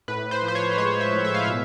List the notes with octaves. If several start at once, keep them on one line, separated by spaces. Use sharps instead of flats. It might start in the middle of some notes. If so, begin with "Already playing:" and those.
A2 B4
C5
F3
C5
C#5
C5
G#3 C#5
E5
A2
E5
F5
B2 E5